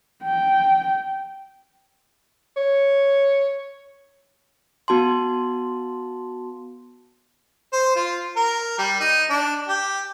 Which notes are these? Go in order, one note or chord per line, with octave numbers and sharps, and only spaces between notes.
G5
C#5
B3 F#4 A5 C6
C5
F4
A#4
G3
D#4
D4
G4